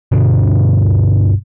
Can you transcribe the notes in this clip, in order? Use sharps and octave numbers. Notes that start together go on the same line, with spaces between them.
G2 B2 D3 D4